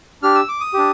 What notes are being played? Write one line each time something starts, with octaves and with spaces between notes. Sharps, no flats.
D4 G4 F6
E6
D6
D#6
D4 G4